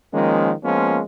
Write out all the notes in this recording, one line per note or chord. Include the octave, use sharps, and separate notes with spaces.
D#3 F3 G#3 A#3 C#4
F3 G#3 A#3 B3 C#4 F4